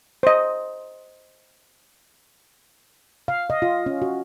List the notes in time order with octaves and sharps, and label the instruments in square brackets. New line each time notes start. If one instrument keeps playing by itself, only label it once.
[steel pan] C5 D#5
[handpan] F5
D#5
F4
C#4
F#4